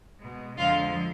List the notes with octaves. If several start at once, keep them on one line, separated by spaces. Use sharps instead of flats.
B2 G#3
F2 D3 F3 G#3 F4 F5